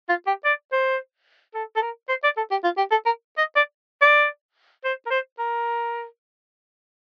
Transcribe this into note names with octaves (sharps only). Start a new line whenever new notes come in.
F4
G4
D5
C5
A4
A4
A#4
C5
D5
A4
G4
F4
G4
A4
A#4
D#5
D5
D5
C5
A#4
C5
A#4